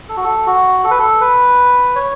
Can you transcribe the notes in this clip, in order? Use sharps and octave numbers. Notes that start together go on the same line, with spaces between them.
A4
F#4
A4
F#4
A4
B4
A4
B4
C#5